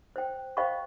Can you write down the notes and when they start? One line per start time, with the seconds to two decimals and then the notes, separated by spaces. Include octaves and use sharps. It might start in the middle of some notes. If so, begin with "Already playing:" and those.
0.16 C5 G5
0.57 C5 D#5 F5 G5 B5 C#6